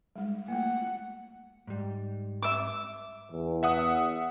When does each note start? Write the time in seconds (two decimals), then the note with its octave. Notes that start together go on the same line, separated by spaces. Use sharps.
0.16 G3 G#3
0.48 A3 A#3 F#5
1.67 G#2 G3
2.43 E5 D6
3.32 E2
3.63 E5 F#5 D#6